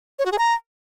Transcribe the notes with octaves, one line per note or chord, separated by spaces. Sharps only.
C#5
F#4
G#4
A#5